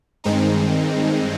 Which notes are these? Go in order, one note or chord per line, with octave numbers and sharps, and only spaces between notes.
G2 D#3 G#3 C4 D#4